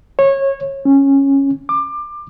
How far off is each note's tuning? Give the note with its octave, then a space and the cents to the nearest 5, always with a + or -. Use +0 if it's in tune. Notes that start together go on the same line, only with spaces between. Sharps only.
C#5 -20
C#4 -10
D6 +25